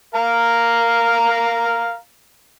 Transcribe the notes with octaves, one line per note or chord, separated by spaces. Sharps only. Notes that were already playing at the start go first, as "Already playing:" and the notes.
A#4 F5 A#5